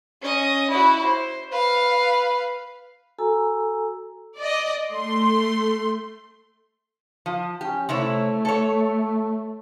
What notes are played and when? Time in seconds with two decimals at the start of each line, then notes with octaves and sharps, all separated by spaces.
0.22 C#4 D#5
0.70 E4 F#4
1.05 C5
1.52 B4 F5
3.18 F#4 A4 G#5 A#5 E6
4.38 D5 D#5
4.91 A3 C6
7.26 F3
7.61 C#4 G4
7.89 C3 A3 E4 C#5
8.45 A4 C#5